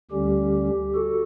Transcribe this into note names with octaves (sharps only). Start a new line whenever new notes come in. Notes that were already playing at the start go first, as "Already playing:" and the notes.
D2 D3 G3 C#4 G4
F#4 A4